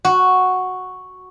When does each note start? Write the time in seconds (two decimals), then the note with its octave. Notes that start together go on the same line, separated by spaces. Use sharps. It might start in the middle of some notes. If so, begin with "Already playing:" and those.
0.05 F#4